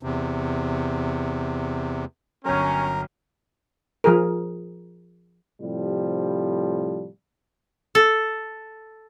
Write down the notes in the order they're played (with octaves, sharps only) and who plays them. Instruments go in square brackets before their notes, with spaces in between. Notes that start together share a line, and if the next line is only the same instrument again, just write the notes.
[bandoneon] E2 C3
[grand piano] G1 F#3 [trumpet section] C#4 [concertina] A#4
[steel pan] F3 G#4 A#4
[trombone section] A2 C3 F3 G3
[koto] A4